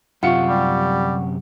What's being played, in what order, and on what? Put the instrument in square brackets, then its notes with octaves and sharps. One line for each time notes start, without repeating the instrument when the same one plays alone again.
[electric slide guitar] F#2 C3 G4 [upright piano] F4 C#7 [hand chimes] F#5 C#6
[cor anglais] G3